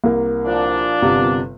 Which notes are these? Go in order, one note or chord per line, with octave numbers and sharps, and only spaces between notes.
C2 A#3
A#2 F3 D4
G1 C3 B3